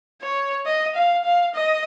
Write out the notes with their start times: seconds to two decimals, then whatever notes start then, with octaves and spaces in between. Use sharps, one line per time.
0.22 C#5
0.66 D#5
0.95 F5
1.25 F5
1.55 D#5